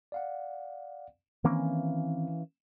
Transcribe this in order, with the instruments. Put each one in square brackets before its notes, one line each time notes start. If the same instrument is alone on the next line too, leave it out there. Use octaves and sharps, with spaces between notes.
[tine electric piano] D5 F5 F#5
[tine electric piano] D#3 C4 [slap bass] E3 A#3 C#4